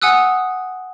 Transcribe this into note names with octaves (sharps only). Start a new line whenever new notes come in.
F#5 G#5 D#6 E6 F#6